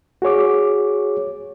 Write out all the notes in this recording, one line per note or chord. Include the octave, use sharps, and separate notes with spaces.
F#4 G#4 C#5 D6